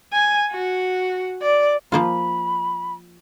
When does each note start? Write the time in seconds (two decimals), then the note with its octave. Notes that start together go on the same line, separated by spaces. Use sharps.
0.13 G#5
0.51 F#4
1.42 D5
1.92 F3 A#3 F4 B5